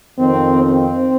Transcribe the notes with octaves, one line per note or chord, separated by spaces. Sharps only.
F2 D#3 C4
C4